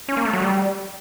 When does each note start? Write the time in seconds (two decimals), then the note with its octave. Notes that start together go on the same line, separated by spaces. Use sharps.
0.09 C#4
0.17 A#3
0.25 A3
0.33 F#3
0.42 G3